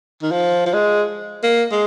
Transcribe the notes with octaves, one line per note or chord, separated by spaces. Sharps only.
D#3
F3
F3
G#3
A#3
G#3